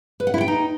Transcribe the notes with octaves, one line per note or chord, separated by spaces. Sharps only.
B4
F#5
E4
G5
D#4